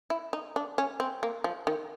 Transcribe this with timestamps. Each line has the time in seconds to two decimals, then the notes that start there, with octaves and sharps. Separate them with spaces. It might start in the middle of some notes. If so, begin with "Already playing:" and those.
0.10 E4
0.33 D#4
0.56 D4
0.78 C#4
1.00 C4
1.23 A#3
1.44 F3
1.67 D#3